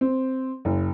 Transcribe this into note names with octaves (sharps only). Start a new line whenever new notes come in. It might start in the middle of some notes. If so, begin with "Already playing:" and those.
C4
F#1